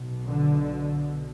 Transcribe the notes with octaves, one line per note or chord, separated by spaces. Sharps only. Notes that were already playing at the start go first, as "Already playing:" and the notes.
Already playing: B1 B2
D3